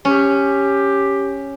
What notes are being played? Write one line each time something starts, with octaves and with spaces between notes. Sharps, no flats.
C#4 G4